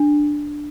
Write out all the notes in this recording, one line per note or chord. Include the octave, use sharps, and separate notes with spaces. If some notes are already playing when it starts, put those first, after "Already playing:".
Already playing: D4